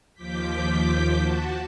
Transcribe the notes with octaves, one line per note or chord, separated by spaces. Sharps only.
D#2 F3 D6 G6 B6
F#4 A5